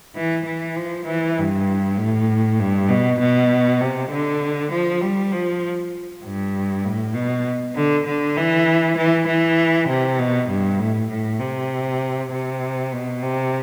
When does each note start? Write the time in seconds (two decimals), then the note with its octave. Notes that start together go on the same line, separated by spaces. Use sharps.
0.16 E3
0.45 E3
0.76 F3
1.06 E3
1.38 G2
1.97 A2
2.59 G2
2.89 B2
3.20 B2
3.81 C3
4.11 D3
4.72 F3
5.01 G3
5.32 F3
6.23 G2
6.84 A2
7.14 B2
7.76 D3
8.06 D3
8.37 E3
8.98 E3
9.28 E3
9.88 C3
10.19 B2
10.49 G2
10.79 A2
11.10 A2
11.40 C3
12.32 C3
12.92 B2
13.22 C3